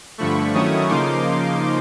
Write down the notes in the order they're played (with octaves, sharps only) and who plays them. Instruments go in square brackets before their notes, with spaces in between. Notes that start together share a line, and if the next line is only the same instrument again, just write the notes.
[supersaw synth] G2 D3 F3 A3 B5 C#6
D#3 F#3 A3 C#4 E4 C#6 D#6
C#3 F3 A#3 D#4 C6 D6